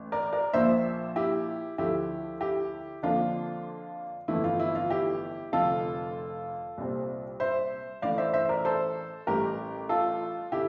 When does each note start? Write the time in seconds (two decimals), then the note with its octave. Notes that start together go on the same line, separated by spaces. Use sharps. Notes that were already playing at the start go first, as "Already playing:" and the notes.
Already playing: A1
0.12 A#4 D5
0.33 A#4 D5
0.53 A#1 A#2 F3 C5 E5
1.16 E4 G4
1.78 D2 D3 F3 A3 E4 G4
2.41 E4 G4
3.03 F2 D3 F3 A#3 D4 F4
4.28 G1 F2 E3 A3 E4
4.44 F4
4.60 E4
4.75 F4
4.90 E4 G4
5.52 F1 F2 D3 F3 F4 A4
6.78 C2 A#2 G3 C4
7.40 C5 E5
8.02 A1 A2 E3 D5 F5
8.18 C5 E5
8.33 C5 E5
8.49 A#4 D5
8.65 A4 C5
9.27 A1 A2 G3 G4 A#4
9.89 F4 A4
10.52 D3 E4 G4